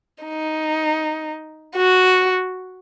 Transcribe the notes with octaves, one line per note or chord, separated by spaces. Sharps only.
D#4
F#4